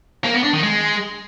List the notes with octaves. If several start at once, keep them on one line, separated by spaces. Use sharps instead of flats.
A#3
B3
D4
D#3
G#3